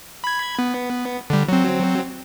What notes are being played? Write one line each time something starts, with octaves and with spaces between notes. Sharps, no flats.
B5 G#6
B3
D3 G3
F#3 C4